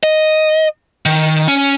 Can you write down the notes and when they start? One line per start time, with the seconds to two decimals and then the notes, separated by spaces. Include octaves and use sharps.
0.03 D#5
1.06 D#3
1.48 C#4